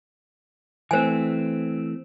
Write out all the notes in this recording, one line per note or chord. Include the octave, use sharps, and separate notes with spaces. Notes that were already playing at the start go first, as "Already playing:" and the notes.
E3 A3 C4 C5 G#5